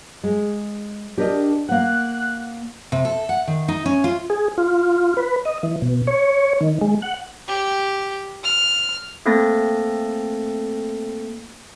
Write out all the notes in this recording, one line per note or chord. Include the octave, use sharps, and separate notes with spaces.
G#3
D4 G4 A#4 D#5
A#3 F#5 F#6
C3
A4
F#5
D#3
D#4
C#4
F4
G#4
F4
B4
D#5
E3
B2
C#5
D#3
G#3
F#5
G4
F6
A3 A#3 C4 A4 A6 A#6